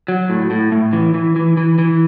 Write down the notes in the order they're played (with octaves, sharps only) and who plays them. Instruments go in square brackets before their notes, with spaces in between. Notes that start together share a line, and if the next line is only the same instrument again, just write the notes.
[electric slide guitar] F#3
A2
A2
A2
E3
E3
E3
E3
E3